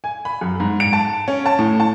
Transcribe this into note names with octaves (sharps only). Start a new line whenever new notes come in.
G#5
B5
F#2
G#2
D7
A5
C#4
A5
A2
A5